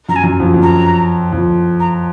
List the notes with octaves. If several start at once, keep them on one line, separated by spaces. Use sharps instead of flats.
F#2 A#5
G#5
F#2
F2
F2
A#5
F2
A#5